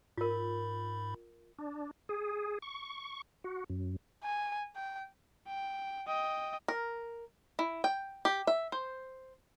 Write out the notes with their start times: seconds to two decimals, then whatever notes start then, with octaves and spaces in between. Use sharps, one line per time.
0.18 G#2 F4 A#4 B5
1.59 D4
2.09 G#4
2.62 C#6
3.44 F#4
3.70 F#2
4.24 G#5
4.76 G5
5.48 G5
6.08 D#5 G5
6.68 A#4
7.59 E4
7.84 G5
8.25 G4
8.47 E5
8.72 C5